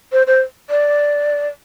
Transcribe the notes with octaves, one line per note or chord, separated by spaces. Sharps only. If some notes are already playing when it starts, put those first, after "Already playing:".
C5
C5
D5